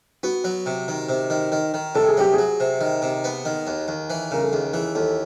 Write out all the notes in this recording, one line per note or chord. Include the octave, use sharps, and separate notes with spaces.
B3 F#4
F#3
C3
D#3
C3
D#3
D#3
D#3
C3 A4
G#4
F#3 G4
F#3 G#4
C3
D#3
C3
B3
D#3
D#2
D#2
E3
C#3 A#4
A4
D#2 G#4
E3 G#4
D#2 A4